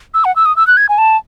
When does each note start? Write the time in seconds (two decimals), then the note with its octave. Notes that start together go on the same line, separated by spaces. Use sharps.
0.14 E6
0.25 F#5
0.36 E6
0.45 D#6
0.56 E6
0.67 F#6
0.77 G#6
0.89 G#5
0.98 A5